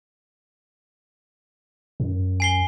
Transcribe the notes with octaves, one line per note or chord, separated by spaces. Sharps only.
F#2
G#5 C7 G7